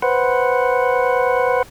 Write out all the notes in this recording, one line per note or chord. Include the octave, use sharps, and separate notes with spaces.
B4 C5 F#5